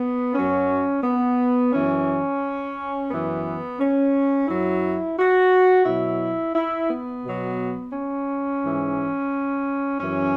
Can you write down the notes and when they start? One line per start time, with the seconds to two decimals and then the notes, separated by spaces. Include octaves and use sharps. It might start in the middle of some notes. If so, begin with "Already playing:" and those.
Already playing: B3
0.34 F#2 F#3 C#4
1.03 B3
1.73 F#2 E3 C#4
3.10 F#2 E3 B3
3.79 C#4
4.47 F#2 F#3 E4
5.17 F#4
5.85 B2 F#3 E4
6.55 E4
6.89 B3
7.24 B2 F#3
7.92 C#4
8.62 G#2 E3
10.00 F#2 E3 C#4